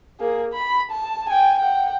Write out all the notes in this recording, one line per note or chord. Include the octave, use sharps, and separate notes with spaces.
A#3 G#4
B5
A5
G5 G#5
F#5 G5